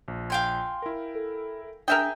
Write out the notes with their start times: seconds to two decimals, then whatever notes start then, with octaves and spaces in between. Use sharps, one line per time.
0.08 A#1
0.30 F5 G5 G#5 C6
0.82 E4 A#4
1.15 A4
1.88 D4 G#4 A#4 E5 G5 G#5 D#6